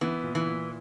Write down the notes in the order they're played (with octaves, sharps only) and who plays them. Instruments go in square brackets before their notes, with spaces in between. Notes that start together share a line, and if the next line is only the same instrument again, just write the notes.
[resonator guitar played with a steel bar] E3 [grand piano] B3
[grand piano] A#2
[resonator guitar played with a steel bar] E3
[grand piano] A#2